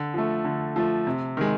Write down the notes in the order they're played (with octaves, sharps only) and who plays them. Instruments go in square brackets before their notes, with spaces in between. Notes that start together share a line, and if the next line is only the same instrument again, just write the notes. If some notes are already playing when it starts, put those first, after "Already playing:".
Already playing: [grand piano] D3
F3 A3
D3
F3 A3
C3
D#3 G#3